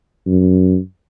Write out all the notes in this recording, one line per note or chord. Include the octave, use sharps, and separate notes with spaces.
F#2